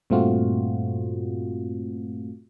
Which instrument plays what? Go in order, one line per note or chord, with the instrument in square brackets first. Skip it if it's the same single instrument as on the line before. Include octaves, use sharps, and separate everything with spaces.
[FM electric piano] G2 A#2 A3 C4 F4 F#4